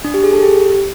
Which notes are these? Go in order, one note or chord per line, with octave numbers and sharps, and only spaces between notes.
D4
G4
G#4
A4
G4